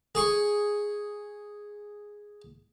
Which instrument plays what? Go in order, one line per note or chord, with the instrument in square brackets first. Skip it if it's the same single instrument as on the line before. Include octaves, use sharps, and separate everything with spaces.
[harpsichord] G#4 C#6